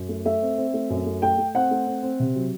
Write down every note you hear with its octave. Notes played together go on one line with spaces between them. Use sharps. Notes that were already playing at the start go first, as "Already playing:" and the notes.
Already playing: F#2
A3
A3 E5
C4
C4
A3
F#2
A3
A3 G5
A3
C4 F#5
A3
C4
C4
C3
F#3